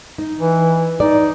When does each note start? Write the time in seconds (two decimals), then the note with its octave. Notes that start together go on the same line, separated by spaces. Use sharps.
0.18 D#4
0.40 E3
1.00 D#4 D5